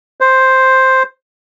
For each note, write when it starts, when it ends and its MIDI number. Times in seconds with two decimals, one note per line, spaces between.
0.21 1.03 72